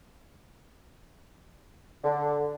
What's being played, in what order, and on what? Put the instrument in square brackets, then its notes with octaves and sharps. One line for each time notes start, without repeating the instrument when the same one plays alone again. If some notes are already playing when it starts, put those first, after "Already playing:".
[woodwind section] D3